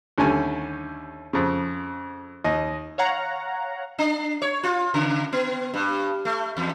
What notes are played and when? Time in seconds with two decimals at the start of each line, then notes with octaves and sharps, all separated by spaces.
0.18 D#2 D3 G3 A3 C#4 G#5
1.33 F2 C#3
2.44 D#2 D#5
2.98 C#5 F5 F#5 A#5
3.99 D4
4.42 C#5
4.63 F4
4.94 C#3
5.33 B3
5.74 G2
6.25 A3
6.57 E2